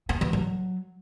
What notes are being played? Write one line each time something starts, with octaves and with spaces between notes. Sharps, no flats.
B3
E3
F#3